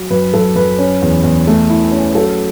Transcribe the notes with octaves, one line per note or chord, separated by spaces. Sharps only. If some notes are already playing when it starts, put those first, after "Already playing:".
Already playing: F#3
F#2 B4
F#2 A4
F#2 B4
C#4
E2
E2
A3
E4
C#4
F#3 A4